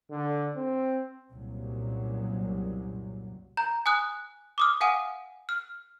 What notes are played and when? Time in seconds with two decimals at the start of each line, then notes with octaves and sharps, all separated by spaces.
0.11 D3
0.56 C4
1.31 C2 F#2 A#2 F#3
3.57 A#5 G6
3.86 G#5 D#6 F#6
4.58 D6 D#6 F6
4.81 F5 F#5 G#5 D#6 D#7
5.49 F6